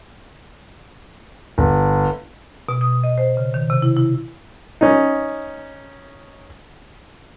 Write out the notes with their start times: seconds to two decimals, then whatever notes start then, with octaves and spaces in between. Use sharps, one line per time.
1.58 G1
2.69 B2
2.81 D#6
3.04 D#5
3.18 C5
3.37 C#3
3.54 D#3
3.70 C3
3.82 E4
3.97 E4
4.81 C#4 D#4